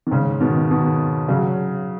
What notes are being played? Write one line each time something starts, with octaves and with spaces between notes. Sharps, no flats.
D#3
G#2 C#3
B2 D#3
B2 D#3
C#3 F#3